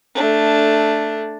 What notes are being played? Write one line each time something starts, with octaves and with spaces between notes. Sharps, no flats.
A3 D4